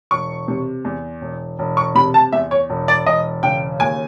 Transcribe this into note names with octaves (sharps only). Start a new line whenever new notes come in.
E1 C#6
C3
E2
E1
E1
C#6
C3 B5
A5
E2 E5
C#5
E1
D5
E1 D#5
C#3 G5
D#2 G#5